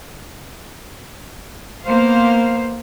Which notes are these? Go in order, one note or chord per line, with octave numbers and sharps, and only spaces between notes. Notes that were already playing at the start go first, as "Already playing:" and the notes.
A#3 B3 C5 F5